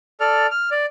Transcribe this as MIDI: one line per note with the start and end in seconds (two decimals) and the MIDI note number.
0.20 0.47 69
0.20 0.47 74
0.20 0.47 89
0.51 0.70 89
0.71 0.86 74